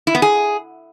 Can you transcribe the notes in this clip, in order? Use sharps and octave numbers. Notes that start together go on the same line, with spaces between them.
E4
B3
G#4